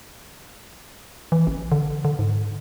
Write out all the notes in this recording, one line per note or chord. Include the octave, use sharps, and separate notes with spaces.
E3
A1
D3
D3
G#2